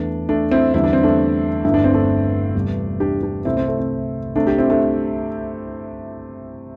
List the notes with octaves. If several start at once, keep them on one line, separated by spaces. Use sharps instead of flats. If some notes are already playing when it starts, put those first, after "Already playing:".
Already playing: E2 E3 A3 D4
A3 D4
C4 E4
E2 D3 G3 E4
D4
C4
A3 D4
G1 G2 D3 A3 E4
D4
C4
A3 D4
E2 C3 G3
D4 G4
D4 G4
C2 C3 A3 C4 E4
C4
A3
C4
C2 C3 A3 D4
D4 G4
C4 E4
A3 D4